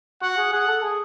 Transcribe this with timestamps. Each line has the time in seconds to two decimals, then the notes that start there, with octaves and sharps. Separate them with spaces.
0.22 F#4 F#5
0.37 G#4
0.52 G#4 F#5
0.68 A4
0.83 G#4